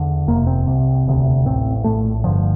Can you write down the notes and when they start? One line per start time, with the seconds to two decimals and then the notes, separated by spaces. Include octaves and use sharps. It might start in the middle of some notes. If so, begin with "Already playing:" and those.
Already playing: E2 D3
0.27 F1 F2 C3 A#3
0.47 C4
0.67 C2 C3
1.06 E1 D2 C3
1.46 A1 A2 C4
1.84 A#1 A2 A3
2.24 G1 G2 D3 F3